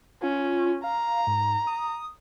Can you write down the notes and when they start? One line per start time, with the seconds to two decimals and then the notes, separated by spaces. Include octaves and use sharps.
0.22 C#4 F4
0.83 F5 A#5
1.27 G#2
1.67 D#6